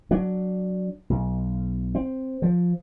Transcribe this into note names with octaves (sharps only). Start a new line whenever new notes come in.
F#3 D4
B1
C4
F3